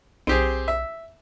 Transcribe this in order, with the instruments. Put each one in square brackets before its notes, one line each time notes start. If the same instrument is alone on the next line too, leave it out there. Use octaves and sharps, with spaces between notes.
[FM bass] B1 [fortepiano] C4 G4 G#4
[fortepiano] E5